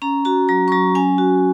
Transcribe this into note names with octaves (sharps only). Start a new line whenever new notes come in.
C#4 A#5
F#4 A#5
F#3 A#5
C#6
F#3 A#5
C#4 G#5
F#4